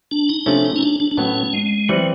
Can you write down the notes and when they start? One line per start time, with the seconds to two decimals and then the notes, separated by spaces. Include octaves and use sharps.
0.11 D4
0.29 D#4
0.46 C3 F3 A3 C#4 D4
0.65 D#4
0.76 C#4
0.83 D4
1.00 D4
1.11 D4
1.17 A2 F#3 B3 C#4
1.53 G#3
1.89 E3 F#3 G3 C4